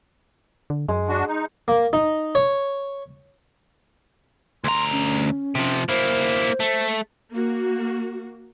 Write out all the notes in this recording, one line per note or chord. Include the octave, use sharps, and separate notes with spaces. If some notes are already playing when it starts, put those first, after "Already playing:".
D3
F#2 G#3
D4 F#4
D#4
A#3
D#4
C#5
D2 A#5 C6
C#4
C3 F3
A#3 E4 C5
A3
A#3 F#4